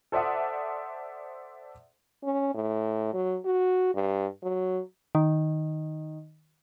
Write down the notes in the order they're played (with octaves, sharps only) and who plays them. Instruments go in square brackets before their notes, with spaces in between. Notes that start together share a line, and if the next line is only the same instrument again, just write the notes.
[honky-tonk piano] A4 C5 D5 E5 F#5 D#6
[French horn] C#4
A2
F#3
F#4
G2
F#3
[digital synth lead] D#3